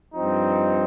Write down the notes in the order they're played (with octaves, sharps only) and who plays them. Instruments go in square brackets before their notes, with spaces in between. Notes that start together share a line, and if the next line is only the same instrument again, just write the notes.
[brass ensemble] G2 F3 C4 D#4